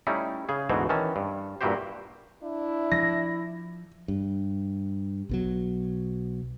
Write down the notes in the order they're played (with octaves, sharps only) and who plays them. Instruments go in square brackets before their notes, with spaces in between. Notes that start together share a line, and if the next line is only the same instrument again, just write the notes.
[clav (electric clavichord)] G3 A3 C#4 D#4 E4
C#3 G#4
D2 G#2 B2 E3 F#4 C5
D#3 E3 C#4 A5
G2
G2 A#2 E4 F#4 G4 C5
[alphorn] D4 [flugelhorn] E4
[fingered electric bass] F3 [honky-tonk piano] A#6
[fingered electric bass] G2
B1 B2 F#3